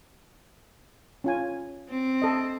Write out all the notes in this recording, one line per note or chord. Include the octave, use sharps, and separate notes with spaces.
C#4 F4 G#5
C4
A4 D#5